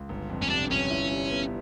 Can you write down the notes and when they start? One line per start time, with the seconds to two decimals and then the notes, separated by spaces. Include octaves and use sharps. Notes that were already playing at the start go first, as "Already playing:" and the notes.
Already playing: C#2
0.09 G1
0.30 F2
0.42 C#4
0.50 C3 D4
0.70 G1 C#4
0.90 E4
1.11 G3
1.30 B3